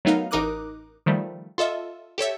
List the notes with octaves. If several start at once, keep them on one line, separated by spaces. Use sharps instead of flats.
F#3 A3 B3 D#4 A#4 F5
A1 D#4 A#4 D6 D#6 F#6
D#3 F3 G3 A3
F4 A4 D#5 E5
G4 A4 C#5 E5